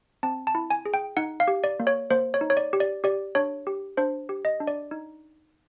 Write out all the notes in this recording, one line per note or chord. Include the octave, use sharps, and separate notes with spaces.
C4 A5
A5
E4
G#5
G#4
G5
D#4 F#5
F5
G4
D5
A#3
C#5
A#3 C5
C#5
D#4
C#5
D5
G4
D5
G4 D5
D4 C#5
G4
D4 C5
G4
D#5
D4
D5
D#4